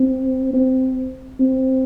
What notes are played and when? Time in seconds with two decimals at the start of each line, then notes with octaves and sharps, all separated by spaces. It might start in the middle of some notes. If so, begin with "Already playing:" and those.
Already playing: C4
0.54 C4
1.40 C4